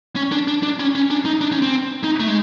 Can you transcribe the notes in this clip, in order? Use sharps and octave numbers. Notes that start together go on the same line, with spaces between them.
C#4
D4
D4
D4
C#4
C#4
D4
D#4
D4
C#4
C4
D#4
A3
G#3